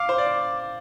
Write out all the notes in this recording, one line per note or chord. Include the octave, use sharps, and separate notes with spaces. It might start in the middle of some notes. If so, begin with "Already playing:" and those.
Already playing: F5 D6
C5
D5